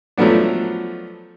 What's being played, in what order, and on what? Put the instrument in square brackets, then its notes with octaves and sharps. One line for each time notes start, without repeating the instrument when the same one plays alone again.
[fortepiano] F3 F#3 A3 B3 D4